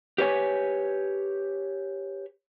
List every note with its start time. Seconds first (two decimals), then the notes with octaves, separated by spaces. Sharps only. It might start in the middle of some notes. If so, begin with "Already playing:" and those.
0.18 G4 B4 C#5 G#5